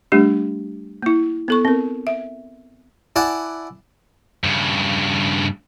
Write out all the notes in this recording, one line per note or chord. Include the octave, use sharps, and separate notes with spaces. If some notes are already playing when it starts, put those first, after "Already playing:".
G3 A3 D4 G4
A#3 E4
B3 A4 C#6
C4 A#4
E5
E4 D5 F#5 G#5 A5
G2 C#3